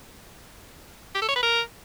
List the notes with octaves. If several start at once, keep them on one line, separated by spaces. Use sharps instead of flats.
G4
A4
C#5
B4
A#4